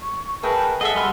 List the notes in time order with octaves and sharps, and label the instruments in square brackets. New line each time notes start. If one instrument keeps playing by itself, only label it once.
[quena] C#6
[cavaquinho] G#4 E5 G5 [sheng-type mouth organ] A#4 B4 [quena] A5
[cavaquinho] G#4 [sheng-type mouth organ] A4 [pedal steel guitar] D#5 E5 [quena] F#5
[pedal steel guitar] G3 C6 F6 [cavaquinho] A#4 B5